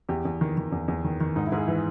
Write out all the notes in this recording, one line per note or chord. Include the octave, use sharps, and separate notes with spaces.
E2 G4
E2
D#3
D#3
E2
E2
D#3
D#3
G#2 D#4
E4
G#2
G#4
E3